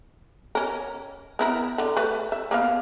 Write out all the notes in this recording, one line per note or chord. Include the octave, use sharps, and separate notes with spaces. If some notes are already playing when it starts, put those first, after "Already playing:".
C#4 A#4
B3 E4 A#4
D3
A3 B4
E5
A#3 B3 F5